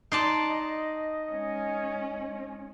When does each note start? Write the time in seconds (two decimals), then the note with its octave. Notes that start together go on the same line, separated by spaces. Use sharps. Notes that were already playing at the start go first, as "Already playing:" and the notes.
0.12 D#4 D5 A5 C6 F#6 C7
0.50 D#5
1.31 G#3 C#4